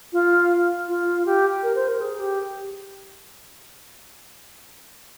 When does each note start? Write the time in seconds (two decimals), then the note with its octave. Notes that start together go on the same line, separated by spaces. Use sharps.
0.13 F4
0.88 F4
1.26 G4
1.63 A#4
1.75 C5
1.88 A#4
2.01 G#4
2.20 G4